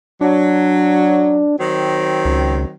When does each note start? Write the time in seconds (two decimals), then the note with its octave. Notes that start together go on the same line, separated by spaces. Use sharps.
0.21 F#3 D4
1.59 D#3 F#3 C4
2.25 C#2